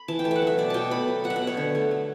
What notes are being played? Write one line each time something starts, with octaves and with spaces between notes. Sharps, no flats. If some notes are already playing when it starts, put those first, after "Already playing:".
Already playing: B5
E3 A5
G5
A3 A5
E5 F#5
F#3
E5
B2 D5
B2 G5 A5
A3 B5
F#3
B2 F#5
E5
F#5
B2
C#5
D3
A3
A3